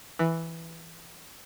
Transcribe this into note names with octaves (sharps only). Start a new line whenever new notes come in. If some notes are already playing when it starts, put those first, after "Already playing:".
E3